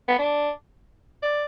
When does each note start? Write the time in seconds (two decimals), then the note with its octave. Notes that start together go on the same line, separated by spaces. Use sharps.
0.08 B3
0.19 D4
1.22 D5